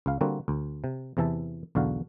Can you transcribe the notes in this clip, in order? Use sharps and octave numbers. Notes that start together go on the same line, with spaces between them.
C#2 F5
D3 G3 A#3 C4 F#4
D2
C3
E2 C3 E3 E5 A5
B1 E2 D3 F#4 F5